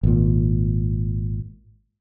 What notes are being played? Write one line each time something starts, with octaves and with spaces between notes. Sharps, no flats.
G#1 A#2